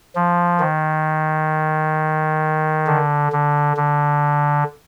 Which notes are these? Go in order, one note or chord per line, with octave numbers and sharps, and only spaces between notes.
F3
D#3
D3
D3
D3